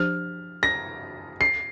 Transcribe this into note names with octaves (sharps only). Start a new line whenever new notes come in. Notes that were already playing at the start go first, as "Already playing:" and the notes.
Already playing: F3 D4 G4 C5 F6
A#6
C7